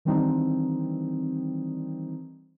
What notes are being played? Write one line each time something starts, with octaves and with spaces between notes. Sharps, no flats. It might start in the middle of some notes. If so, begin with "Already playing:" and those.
D#3 E3 G3 C4 D4 D#4